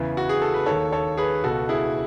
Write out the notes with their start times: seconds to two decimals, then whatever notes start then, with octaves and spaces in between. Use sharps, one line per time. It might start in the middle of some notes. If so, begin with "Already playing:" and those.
Already playing: E2 C#3 E3
0.17 F#4
0.29 G#4
0.42 A4
0.54 B4
0.66 D#2 D#3 A4 C#5
0.92 A4 C#5
1.17 G#4 B4
1.43 C#2 B2 F#4 A4
1.69 E4 G#4